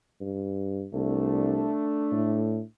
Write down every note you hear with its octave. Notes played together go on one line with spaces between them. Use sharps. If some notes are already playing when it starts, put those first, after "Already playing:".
G2
C2 A3 D4
A2